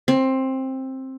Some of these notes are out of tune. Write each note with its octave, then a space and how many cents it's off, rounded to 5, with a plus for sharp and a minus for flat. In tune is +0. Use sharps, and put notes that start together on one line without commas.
C4 +15